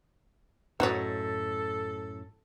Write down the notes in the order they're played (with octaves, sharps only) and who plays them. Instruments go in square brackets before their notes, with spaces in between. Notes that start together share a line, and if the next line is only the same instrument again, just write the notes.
[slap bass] F#2 A2 [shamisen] D#4 F#4 C#5 [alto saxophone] A4